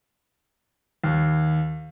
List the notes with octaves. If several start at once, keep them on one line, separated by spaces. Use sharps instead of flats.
D#2